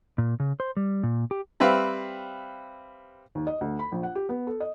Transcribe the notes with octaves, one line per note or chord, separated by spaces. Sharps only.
A#2
C#3
C5
G3
A#2
G4
G3 C4 B4 E5 F5
D#2
D#5
D2
B5
A#1
F#5
G4
B3
A4
D#5